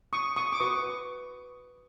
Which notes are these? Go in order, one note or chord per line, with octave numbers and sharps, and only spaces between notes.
C#6 D#6
C#6 D#6
D6
F#4 B4 C#6 D#6